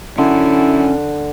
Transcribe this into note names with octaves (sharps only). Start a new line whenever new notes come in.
F#2 D3 C#4 E4